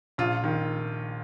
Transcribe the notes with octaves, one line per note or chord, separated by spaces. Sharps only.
A#1 F4
D#3